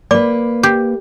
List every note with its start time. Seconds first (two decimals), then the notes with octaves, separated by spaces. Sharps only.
0.11 A#3 B4 D5 D6
0.63 G4